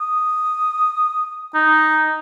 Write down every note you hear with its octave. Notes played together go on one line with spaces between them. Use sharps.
D#6
D#4